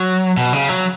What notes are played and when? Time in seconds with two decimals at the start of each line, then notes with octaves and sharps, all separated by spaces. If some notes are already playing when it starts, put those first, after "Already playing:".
Already playing: F#3
0.37 B2
0.53 C#3
0.69 F#3